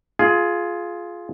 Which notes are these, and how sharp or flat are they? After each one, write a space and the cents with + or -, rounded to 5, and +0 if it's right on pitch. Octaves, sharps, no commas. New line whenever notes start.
F4 +0 G#4 +15